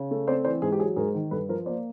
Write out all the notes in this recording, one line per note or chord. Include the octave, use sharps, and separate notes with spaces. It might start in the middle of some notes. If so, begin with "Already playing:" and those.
Already playing: C#3
A3
C4 C5 D5
E3 C5 D5
G#2 G#4
G4
F#3 G#4
G#2 G#4 A#4
D#3
G2 A4 B4
F3 A#4 C5
A#3 C5 D5